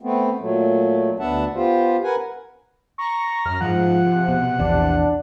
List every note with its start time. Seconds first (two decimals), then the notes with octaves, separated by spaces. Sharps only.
0.01 A3 B3 C4
0.40 A#2 F#3 A3
1.19 D2 B3 D4 E5 F#5 A5
1.55 B3 F4 G4 C5
2.04 A#4 B4 F#5 G#5
2.98 A#5 C#6
3.45 F#2 F6
3.61 G#2 F3 F#5
4.06 C3
4.28 B2
4.58 A#1 E2 E3 D4